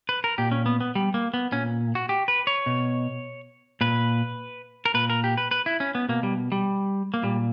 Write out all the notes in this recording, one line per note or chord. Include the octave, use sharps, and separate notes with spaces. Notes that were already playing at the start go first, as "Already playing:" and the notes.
B4
A#4
A#2 G4
C#4
B3
B3
G3
A#3
B3
A#2 C#4
F#4
G4
B4
C#5
B2
A#2 B4
A#4
A#2 B4
A#4
G4
B4
B4
E4
C#4
B3
B2 A#3
G3
G3
A#3
A#2 G3